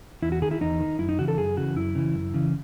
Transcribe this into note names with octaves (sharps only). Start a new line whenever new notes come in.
E2 E4
F#4
D#3 G#4
E4
E2 D#4
D#3
F#2 E4
D#4
C#3 E3 F#4
A4
F#2 G#4
C#3 E3 F#4
F#2 E4
C#3 E3
F#2
C#3 E3